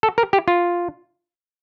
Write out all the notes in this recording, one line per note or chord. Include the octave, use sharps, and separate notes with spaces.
A4
A#4
G4
F4